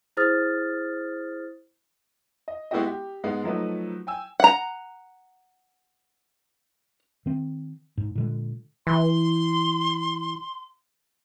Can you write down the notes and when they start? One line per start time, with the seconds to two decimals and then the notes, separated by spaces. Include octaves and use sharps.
0.17 E4 G#4 C5 D#6 F6 A6
2.48 D#5
2.71 G#3 B3 E4 F#4 G4 D#5
2.87 G4
3.24 G#2 G#3 B3
3.44 F3 F#3 A3 D#4 B4
4.07 G5 G#5 E6
4.40 F#5 A#5
7.26 D#3 C4
7.97 G#2
8.15 A#2 D3 G#3
8.87 E3 C6